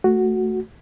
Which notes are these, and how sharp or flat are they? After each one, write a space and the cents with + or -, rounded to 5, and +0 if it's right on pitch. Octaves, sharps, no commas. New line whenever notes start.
A3 +0 F#4 +0